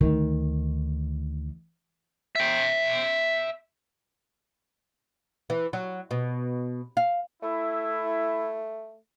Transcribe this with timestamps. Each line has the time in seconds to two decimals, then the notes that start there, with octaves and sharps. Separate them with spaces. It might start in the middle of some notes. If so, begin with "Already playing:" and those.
0.01 D2 D#3
2.36 E5 G5
5.50 E3
5.73 F#3
6.11 B2
6.97 F5
7.42 A3 E4